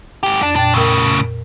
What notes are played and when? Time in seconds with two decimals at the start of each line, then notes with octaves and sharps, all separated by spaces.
0.23 G#2 G4
0.43 F2 D4
0.56 A#2 D4 G5 A6
0.74 A2 C#3 A#4 E6